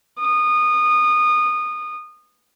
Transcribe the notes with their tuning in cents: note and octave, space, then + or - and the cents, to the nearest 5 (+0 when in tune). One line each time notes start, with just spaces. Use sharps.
D#6 -25